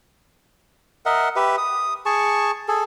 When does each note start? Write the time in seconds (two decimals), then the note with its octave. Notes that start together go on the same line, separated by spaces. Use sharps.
1.06 A#4 D#5 E5 F#5
1.36 G4 B4 E5
1.58 D#6
2.06 G#4 A5 C#6
2.68 G#4 A4